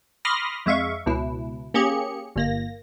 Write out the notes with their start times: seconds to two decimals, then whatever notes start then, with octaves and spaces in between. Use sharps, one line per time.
0.25 B5 C6 D6 D#6 F6 A#6
0.66 F2 G#3 E5 F5 C#6
1.06 C#2 B2 E4
1.74 A#3 C#4 G4 G#4 C#7
2.36 G1 A#3 A#6